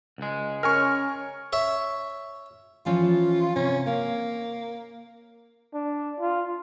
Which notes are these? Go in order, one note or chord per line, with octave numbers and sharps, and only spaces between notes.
C#2 G#3
C#4 A#4 G#5 C#6 F6
C#5 E5
E3 F3 C#4 F4
C3 C#4
A#3 F5
D4
F4